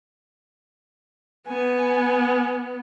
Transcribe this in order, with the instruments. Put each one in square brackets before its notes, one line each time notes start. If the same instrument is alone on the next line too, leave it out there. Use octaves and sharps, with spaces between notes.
[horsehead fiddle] B3 [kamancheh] G#5